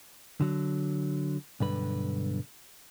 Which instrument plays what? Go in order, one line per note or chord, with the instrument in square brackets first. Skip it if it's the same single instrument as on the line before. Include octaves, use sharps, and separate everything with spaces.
[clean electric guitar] D3 F#3
B1 G2 D3 B4